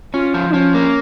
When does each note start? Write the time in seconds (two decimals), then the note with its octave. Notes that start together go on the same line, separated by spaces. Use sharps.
0.14 C#4 F4
0.34 F3
0.54 F3 C#4
0.74 A#3